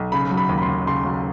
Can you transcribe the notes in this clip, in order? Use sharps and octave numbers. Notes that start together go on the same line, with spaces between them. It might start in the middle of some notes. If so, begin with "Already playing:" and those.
Already playing: B1
C#3 B5
F#3
B5
D#2
B5
C6
D#2
C#3 C6
F#3